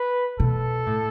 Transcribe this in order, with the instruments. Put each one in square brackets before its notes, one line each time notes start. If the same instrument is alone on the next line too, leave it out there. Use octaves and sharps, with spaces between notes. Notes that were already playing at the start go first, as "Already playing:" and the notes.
Already playing: [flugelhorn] B4
[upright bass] B2 [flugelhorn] A4
[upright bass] A2